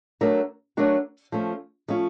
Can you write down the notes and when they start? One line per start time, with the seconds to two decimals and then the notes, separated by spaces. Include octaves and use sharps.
0.21 F#3 A3 D4 F#4 A#4
0.77 F#3 A3 D4 F#4 A#4
1.32 F3 A3 C#4
1.88 F3 A3 C#4